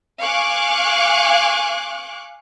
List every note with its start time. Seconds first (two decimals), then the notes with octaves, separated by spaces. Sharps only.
0.22 F5 G#5 C#6 D6 F#6